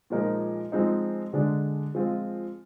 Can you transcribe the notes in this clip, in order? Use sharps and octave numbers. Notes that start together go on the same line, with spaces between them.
A#2 F3 G#3 D#4 A#4
F3 G#3 C4 D#4
D3 G#3 D4
F3 G#3 C4 F4